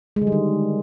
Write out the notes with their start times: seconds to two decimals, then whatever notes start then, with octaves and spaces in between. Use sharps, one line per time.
0.16 G#3
0.22 D3
0.27 G3
0.32 D#3